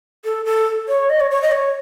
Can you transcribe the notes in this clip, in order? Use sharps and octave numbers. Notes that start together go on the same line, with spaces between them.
A4
A4
C#5
D#5
C#5
C#5
D#5
C#5